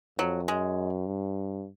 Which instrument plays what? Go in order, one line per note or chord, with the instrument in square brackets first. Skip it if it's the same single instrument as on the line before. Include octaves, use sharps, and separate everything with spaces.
[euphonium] F2 [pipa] F#3
[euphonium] F#2 [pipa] G#3
[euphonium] G2